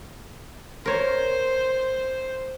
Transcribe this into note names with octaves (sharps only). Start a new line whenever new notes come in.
A#4 C5 C#5